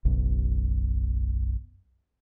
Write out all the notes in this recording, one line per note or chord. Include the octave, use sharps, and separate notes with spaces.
F#1 B1 F#2